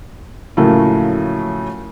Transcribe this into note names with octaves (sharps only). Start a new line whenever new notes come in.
A2 C#3 F3 F#3 A3 A#3